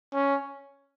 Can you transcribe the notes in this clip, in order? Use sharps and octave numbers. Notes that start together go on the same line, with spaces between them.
C#4